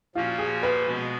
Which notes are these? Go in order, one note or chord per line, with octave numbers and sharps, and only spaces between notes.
A#2 F3 A#3 C#4 F4 F#4
G#4
B4
B2 G#3 B3 F#4